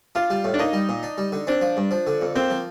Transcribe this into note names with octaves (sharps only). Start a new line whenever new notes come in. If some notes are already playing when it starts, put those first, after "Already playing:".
D4 F4
G3
A2
D4
A#3 D#4
G3
A#2
D4
G3
D3
C4 D4
F3
G2
F3
D3
F2
A#3 C4
F3